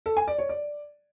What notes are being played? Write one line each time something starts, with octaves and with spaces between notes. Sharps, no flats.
A4
G#5
D5
C#5
D5